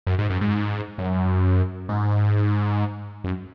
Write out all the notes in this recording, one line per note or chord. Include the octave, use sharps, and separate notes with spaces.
F#2
G#2
F#2
G#2
F#2
G#2
F#2